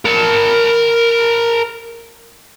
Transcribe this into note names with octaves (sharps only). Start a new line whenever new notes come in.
A#4 A5